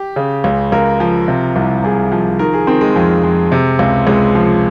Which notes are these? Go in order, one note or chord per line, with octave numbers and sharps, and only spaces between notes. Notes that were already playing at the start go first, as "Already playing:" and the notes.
Already playing: G4
C#3
C#2
C#2 A#4
F3
C3
C2
C2 G#4
F3
D#3 A#4
G#4
D#3 C4
G#3
F2
F2
C3
C#2
C#2 G#3
F3